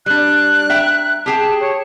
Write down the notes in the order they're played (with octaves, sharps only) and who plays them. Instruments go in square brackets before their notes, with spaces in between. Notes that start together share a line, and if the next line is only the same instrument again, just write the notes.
[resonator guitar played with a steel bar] G3 D4 [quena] F#6
[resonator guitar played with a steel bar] E5 G5 A#5
[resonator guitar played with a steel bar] G4 G#4 G5 [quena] A5
[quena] C#5